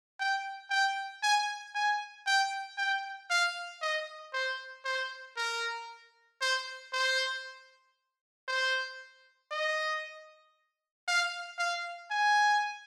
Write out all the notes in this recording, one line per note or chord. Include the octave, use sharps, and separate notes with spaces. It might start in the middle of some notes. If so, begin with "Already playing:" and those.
G5
G5
G#5
G#5
G5
G5
F5
D#5
C5
C5
A#4
C5
C5
C5
D#5
F5
F5
G#5